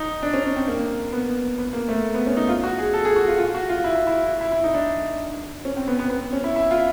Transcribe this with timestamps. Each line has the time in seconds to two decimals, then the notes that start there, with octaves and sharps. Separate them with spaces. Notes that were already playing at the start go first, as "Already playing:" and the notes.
Already playing: D#4
0.23 D4
0.34 C#4
0.45 C#4
0.56 C4
0.68 A#3
1.13 B3
1.58 B3
1.73 A#3
1.88 A3
2.15 B3
2.26 C#4
2.37 D#4
2.48 F4
2.64 F#4
2.78 G#4
2.94 A4
3.05 G#4
3.16 F#4
3.28 F4
3.38 F4
3.55 F#4
3.69 F4
3.84 E4
3.96 E4
4.07 E4
4.41 E4
4.52 E4
4.64 D#4
4.75 D4
5.65 C#4
5.77 C4
5.88 B3
5.99 B3
6.10 B3
6.33 C#4
6.44 E4
6.56 E4
6.71 F4